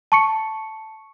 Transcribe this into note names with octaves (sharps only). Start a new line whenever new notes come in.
A5 C#6 C#7